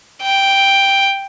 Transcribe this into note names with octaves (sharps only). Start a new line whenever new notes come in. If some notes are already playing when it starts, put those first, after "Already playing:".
G5